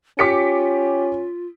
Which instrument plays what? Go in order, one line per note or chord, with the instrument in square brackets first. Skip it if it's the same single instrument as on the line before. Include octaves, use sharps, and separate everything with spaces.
[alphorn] C#4 [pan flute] F4 [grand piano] G4 [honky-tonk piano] D6 B6 C#7